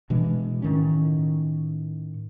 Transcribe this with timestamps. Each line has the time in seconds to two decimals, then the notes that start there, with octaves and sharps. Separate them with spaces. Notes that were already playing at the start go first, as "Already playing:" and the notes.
0.10 B2 E3 G#3 D4
0.62 A2 D#3 C#4